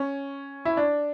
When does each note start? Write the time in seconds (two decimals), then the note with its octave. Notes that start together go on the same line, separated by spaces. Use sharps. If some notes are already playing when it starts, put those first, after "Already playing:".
Already playing: C#4
0.65 E4
0.77 D4